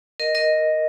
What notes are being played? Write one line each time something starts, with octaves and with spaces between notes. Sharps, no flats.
A#4 D#5
A#4 D#5